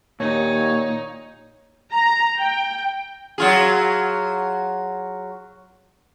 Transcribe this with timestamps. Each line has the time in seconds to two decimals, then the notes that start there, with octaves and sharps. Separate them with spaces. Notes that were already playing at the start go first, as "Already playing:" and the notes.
0.20 D#2 A#2 D#4 C#5
1.91 A#5
2.39 G5
3.38 F#3 F4 G#4